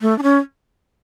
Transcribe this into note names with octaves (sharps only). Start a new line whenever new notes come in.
A3
D4
C#4